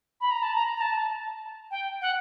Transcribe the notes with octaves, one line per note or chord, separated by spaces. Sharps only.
B5
A#5
A5
A#5
A#5
A5
G5
F#5